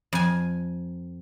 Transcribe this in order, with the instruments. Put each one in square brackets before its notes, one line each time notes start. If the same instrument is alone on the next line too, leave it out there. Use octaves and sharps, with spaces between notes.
[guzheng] F2 G#5